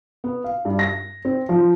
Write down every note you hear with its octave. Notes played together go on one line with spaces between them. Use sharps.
B3
F5
G2
A#6
C4
F3